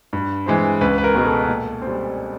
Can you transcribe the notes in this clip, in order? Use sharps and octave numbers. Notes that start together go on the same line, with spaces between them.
G2
E3 G#3 C4
C#2 B4
B4
A#4
B2 G#3 B3 A#4
A4
A#2
C4
G3